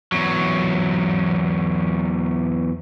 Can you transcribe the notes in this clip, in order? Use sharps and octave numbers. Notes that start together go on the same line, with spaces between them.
E2 F#3